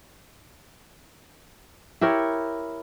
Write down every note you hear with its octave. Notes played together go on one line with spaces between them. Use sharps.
E4 G4 A#4 C#5